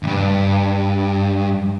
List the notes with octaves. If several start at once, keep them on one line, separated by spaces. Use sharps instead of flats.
D2 G2